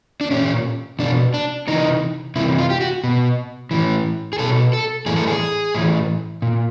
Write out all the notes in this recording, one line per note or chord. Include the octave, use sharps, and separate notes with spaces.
D4
A#2 C#4
B2 D4
D4
C3 E3 D#4
C3 E3 E4
F4
G4
F#4
B2
A2 E3
G#4
B2 A4
A4
A2 E3 G#4
A4
G#4
A2 E3
A#2